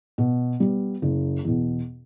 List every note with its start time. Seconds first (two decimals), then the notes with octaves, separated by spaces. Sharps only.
0.18 B2
0.60 G3 B3
1.02 F#1
1.45 E2 B2